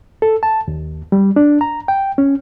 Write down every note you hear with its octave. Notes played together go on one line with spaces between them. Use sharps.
A4
A5
D#2
G3
D4
A#5
G5
C#4